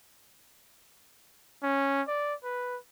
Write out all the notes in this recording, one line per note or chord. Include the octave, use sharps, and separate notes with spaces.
C#4
D5
B4